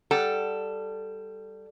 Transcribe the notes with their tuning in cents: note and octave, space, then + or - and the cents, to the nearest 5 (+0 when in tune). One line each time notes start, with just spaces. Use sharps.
G3 +0 A4 +0 F#5 +0